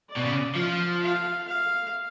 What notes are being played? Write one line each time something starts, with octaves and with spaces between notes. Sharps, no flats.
D5
B2
C#3
F3 F5
F5
F5